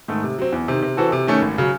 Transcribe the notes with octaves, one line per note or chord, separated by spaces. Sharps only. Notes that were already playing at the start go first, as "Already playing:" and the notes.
G#2 D#3 A3
C3
F#3 C4
E2
C3 D#3
C3
E3 C4 F#4 A4
C3
D#3 A3 C#4
G#1
C#3 F#3